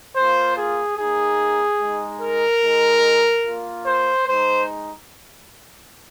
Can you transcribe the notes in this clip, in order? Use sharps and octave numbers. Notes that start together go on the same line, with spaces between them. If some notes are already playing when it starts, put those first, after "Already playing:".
A#3 F4 C5
G#4
A#3 D#4 G#4
G#3 D#4
A#4
G#3 D#4
A#3 F4
C5
G#3 D#4 C5